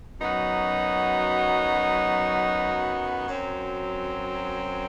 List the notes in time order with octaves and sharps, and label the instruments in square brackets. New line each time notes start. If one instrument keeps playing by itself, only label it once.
[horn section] F#2 F#3 B3 D#4 F#4
F#2 F#3 C4